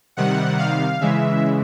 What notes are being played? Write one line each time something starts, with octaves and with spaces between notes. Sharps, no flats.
C3 D#3 G3 F#5
F5
C#3 E3 G#3 E5